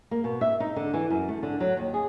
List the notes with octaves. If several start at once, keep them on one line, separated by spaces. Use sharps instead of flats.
A#3
B2
E5
D#4
D3
E3
F#2
A3
D3
F#3
D#2
G#4